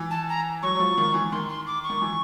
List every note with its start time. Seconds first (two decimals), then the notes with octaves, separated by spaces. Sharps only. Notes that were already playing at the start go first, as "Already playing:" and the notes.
Already playing: E3
0.10 A5
0.28 A#5
0.62 F#3 C#6
0.75 F#3
0.80 F3
0.98 D#3
1.14 E3
1.31 D#3 C6
1.49 C6
1.67 D6
1.83 C#6
1.90 D#3
2.02 E3